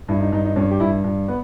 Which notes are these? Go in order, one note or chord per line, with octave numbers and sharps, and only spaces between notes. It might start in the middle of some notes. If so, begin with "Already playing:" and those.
G2 E4
D#4
G2 D#4
D#4
G2 C#4
G4
G2 E4
G2
B3